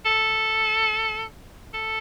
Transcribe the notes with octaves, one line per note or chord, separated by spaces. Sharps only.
A4
A4